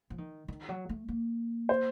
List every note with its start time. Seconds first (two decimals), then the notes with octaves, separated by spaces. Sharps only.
0.10 F3
0.18 D#3
0.48 D#3
0.69 F#3
0.89 A3
1.08 A#3
1.69 C5